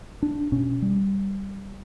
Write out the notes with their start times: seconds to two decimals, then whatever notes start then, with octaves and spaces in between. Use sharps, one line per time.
0.22 D4
0.52 B2 C#4
0.82 G3